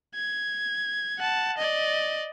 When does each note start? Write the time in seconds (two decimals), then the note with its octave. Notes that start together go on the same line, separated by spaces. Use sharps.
0.15 G#6
1.18 F#5 A5
1.58 D5 D#5